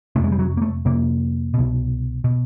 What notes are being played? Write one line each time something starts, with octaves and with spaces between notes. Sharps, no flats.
F2 C3 G#3 A3
G3
F#3
A#3
A3
F2 C3 A#3
C2 B2
B2